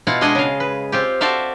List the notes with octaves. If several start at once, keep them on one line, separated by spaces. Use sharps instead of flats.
B2 E4 F4 F5 F#5
G#3 D4 G#4 D#5 F#5
C#3 F5
B4
C4 F4 G4
F#4 A4 C5 D5 E5 F5